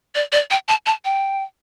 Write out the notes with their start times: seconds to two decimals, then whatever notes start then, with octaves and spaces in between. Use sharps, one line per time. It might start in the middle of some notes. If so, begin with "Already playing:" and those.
0.15 D5
0.32 D5
0.50 G5
0.68 A5
0.86 A5
1.05 G5